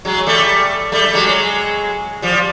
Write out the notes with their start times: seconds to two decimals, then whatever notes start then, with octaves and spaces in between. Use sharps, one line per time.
0.05 F#3 G#3
0.27 G3 A3
0.92 G3 A3
1.04 G3
1.14 F#3 G#3
2.22 F3 G3